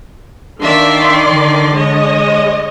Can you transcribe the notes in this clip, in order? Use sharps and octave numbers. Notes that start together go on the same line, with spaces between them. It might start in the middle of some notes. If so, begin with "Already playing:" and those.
D#3 D4 D5 E5 F5 C6
D3
G#3 C#5 D#5